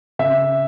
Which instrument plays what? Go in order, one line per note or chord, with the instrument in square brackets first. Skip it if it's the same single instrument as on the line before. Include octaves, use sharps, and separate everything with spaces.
[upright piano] C#3 E5